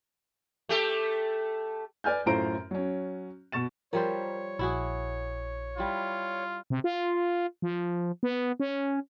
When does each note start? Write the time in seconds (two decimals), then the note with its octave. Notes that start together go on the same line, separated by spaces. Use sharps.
0.69 A3 G4 A4
2.04 B4 D5 G#5 F6 G6
2.26 F#2 A2 F4 C5 A#5 D7
2.71 F#3 C#4
3.52 B2 C#6 A6 E7
3.93 F3 G3 A#4 C5 C#5
4.59 A#1 E4 F#4 G#4
5.78 G3 E4 F4
6.70 C3
6.84 F4
7.62 F3
8.23 B3
8.60 C#4